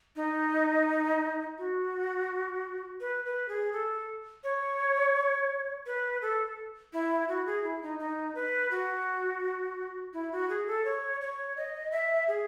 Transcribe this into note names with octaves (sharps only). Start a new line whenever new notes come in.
D#4
F#4
B4
B4
G#4
A4
C#5
B4
A4
E4
F#4
G#4
E4
D#4
D#4
B4
F#4
E4
F#4
G#4
A4
C#5
C#5
D#5
E5
G#4